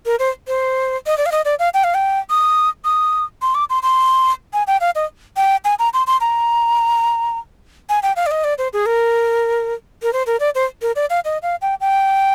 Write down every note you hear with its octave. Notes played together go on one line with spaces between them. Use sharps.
A#4
C5
C5
D#5
D5
F5
D#5
D5
F5
G5
F5
G5
D#6
D#6
C6
D6
C6
C6
G#5
G5
F5
D#5
G5
G#5
A#5
C6
C6
A#5
G#5
G5
F5
D5
D#5
D5
C5
G#4
A#4
A#4
C5
A#4
D5
C5
A#4
D5
F5
D#5
F5
G5
G5